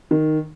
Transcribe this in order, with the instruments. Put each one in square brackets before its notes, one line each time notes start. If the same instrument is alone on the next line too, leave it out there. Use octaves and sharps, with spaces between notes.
[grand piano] D#3